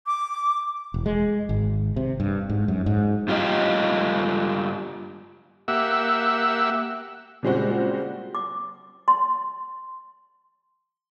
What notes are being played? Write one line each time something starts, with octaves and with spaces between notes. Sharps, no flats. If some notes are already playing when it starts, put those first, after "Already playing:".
D6
E1
G#3
G#1
C3
G2
G#2
F#2
G#2
G2 F4 G4 D#5
A#3 G4 E5 F#5 E6
A#2 C#3 G3 G#3 C4 F#4
D6
C6